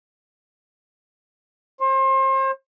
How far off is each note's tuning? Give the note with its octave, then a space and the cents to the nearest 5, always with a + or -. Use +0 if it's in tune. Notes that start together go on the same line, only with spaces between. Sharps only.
C5 +35